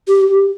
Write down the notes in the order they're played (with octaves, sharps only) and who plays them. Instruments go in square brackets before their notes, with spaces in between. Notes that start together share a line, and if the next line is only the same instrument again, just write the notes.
[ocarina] G4